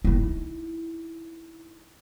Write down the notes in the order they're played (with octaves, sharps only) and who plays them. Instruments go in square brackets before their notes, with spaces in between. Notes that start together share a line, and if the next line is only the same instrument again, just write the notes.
[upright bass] D#4 E4